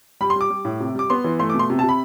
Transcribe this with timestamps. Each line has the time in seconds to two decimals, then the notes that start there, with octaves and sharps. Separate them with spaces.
0.21 G3 B5
0.30 C6
0.35 G3
0.41 D6
0.50 G3
0.65 A2
0.80 C3
0.95 G3 D6
1.10 B3 C6
1.24 E3
1.39 A3 C6
1.50 D6
1.54 B2
1.59 C6
1.70 C3
1.79 A5
1.84 C3 B5